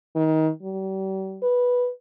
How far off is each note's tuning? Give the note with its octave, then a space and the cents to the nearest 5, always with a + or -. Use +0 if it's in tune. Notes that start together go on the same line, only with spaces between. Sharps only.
D#3 +25
G3 -40
B4 -5